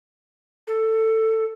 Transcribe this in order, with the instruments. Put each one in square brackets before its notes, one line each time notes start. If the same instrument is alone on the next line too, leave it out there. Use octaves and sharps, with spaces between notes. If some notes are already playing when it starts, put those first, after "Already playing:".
[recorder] A4